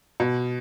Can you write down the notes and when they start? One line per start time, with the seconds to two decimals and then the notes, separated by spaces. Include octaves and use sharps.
0.20 B2